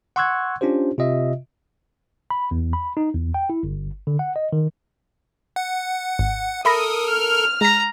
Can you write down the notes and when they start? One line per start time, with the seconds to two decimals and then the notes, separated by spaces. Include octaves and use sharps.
0.16 F#5 C6 C#6 E6 F#6 G#6
0.61 C#4 D4 F4 G4 C5
0.98 C3 F4 D#5 E5
2.30 B5
2.51 E2
2.73 B5
2.97 D#4
3.14 E2
3.34 G5
3.50 E4
3.63 G1
4.07 D3
4.19 F#5
4.36 D#5
4.53 D#3
5.56 F#5
6.19 G#1
6.65 A4 A#4 E5 B5 D#6 A#6
7.10 F6
7.61 G#3 A#5 B6